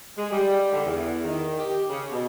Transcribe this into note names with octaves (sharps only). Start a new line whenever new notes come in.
G#3
G3
D3
E2
D#3
G4
C#3
B2